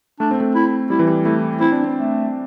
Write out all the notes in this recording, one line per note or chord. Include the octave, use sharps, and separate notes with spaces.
A3 D4
C4
A3
E4
G3 E4
E3
G3
A3 E4
C4 E4
D4
C4
A3